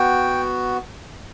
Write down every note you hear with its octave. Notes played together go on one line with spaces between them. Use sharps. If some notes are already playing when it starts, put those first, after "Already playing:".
Already playing: B3 F#4 G5